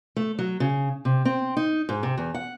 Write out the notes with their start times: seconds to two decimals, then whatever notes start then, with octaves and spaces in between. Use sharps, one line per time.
0.17 A3
0.39 F#3
0.60 C#3
1.05 C3
1.25 C4
1.57 D#4
1.89 G#2
2.03 C3
2.18 E2
2.35 F#5